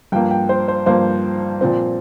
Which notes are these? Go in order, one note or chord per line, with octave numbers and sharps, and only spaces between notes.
G2 F3 A#3 G5
G5
C5
C5
G2 F3 A#3 C5
A#2 F3 C4